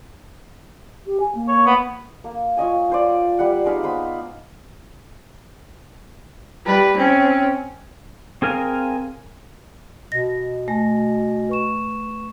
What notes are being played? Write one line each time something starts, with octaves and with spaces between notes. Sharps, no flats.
G4
G#5
A#3
C#5
B3
A#3
F4 C#5 D#5 G#5
F4 C5 D5
G3 F#5
G#3 D#4 B4 F5
B3 C5 B5
G3 B4
C4 C#4
C4 G#4 A#4 F5 G#5
B2 D#5 A#6
A3 F#4 G#5 A#6
B4 C#6 E7